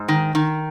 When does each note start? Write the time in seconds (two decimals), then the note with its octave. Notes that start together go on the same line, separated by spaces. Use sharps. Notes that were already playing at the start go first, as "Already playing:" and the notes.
Already playing: G#2
0.08 D#3
0.35 D#3